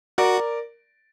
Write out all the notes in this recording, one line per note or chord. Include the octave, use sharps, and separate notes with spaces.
F#4 A#4 D5